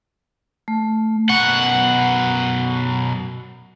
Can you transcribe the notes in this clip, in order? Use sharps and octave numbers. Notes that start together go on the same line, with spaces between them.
A3
F#2 B2 F#5